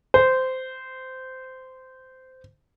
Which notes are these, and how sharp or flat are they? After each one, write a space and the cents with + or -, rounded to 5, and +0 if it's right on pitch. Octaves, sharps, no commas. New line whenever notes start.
C5 -15